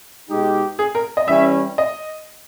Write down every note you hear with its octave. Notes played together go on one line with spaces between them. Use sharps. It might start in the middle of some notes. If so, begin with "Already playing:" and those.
B2 G#3 D#4 G4
G#4
A#4
D#5
E3 G3 C#4 E5
D#5